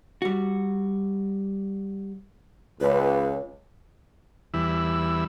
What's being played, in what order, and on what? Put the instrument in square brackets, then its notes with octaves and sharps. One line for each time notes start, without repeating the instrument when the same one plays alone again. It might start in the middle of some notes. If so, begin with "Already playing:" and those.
[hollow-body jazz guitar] G3 F#4
[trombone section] C#2 [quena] B4
[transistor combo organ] E2 E3 G3 E4 B5 E6